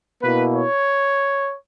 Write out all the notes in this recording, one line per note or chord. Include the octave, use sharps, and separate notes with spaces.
B2 A#3 E4 B4
C#5